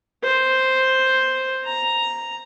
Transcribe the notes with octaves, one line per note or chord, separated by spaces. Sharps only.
C5
A#5